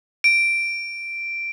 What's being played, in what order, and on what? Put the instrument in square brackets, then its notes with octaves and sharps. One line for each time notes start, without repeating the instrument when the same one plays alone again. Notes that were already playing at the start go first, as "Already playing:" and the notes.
[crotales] D7